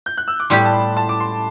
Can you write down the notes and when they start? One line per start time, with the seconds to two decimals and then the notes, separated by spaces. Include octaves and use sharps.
0.06 G6
0.17 F#6
0.28 E6
0.40 D6
0.50 A2 G3 B3 E4 G4 C6
0.65 A5
0.73 B5
0.97 A5
1.09 D6
1.20 C6